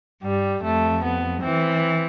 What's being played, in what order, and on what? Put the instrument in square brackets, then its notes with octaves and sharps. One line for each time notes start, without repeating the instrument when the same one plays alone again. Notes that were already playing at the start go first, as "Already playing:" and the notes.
[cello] G2 [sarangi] G3
[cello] F2 [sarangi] A3
[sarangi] B3
[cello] E3 [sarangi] C4